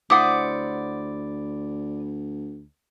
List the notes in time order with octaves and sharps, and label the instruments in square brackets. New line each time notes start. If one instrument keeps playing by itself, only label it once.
[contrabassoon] D2 [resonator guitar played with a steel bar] E4 C5 F#5 [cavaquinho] D5 D#6 [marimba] D6